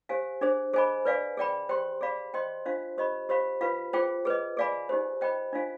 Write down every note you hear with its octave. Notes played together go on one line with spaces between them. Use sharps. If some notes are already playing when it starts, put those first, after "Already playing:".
G4 C5 F5 G#5
D4 G#4 C5
G#4 C5 D#5 G#5 B5
B4 D5 F5 G#5
G#4 D5 G5 B5
G4 C5 G5 C6
G#4 D5 F5 B5
C5 D#5 G5 C6
D4 F4 C5 F5
G4 C5 D#5 B5
G4 C5 F5 B5
F4 B4 F5 B5
F4 G#4 C5 G5
G#4 B4 D#5
G#4 D5 F5 G#5 B5
D#4 G4 C5
C5 D#5 G5 B5
D4 F4 C5 F5 G#5